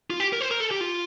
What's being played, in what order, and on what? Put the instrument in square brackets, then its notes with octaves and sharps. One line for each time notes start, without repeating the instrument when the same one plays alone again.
[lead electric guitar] F4
G4
A#4
C5
A#4
A4
G4
F4